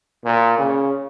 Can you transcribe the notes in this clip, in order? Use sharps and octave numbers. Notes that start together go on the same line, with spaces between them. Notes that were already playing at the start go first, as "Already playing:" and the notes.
A#2
C#3